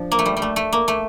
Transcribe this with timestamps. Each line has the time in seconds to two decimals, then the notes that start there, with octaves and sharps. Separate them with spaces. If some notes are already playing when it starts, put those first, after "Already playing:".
Already playing: F3 D4
0.12 A#3
0.19 A3
0.26 G3
0.37 G3
0.42 A3
0.56 A3
0.73 A#3
0.88 A3